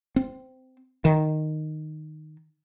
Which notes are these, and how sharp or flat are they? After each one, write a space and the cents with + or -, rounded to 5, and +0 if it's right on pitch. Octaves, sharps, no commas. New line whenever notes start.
C4 -15
D#3 -10